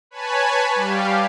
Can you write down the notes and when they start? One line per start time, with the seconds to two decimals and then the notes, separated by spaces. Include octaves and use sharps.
0.11 B4 C#5 G#5 A5 B5
0.75 G3 G4 F5